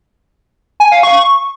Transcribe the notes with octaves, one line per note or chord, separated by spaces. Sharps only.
G#5
F5
C#6